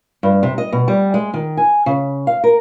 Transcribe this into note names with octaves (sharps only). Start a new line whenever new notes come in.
G2
C3
D#5
B2
G3
G#3
D#3
G#5
C#3
F5
A#4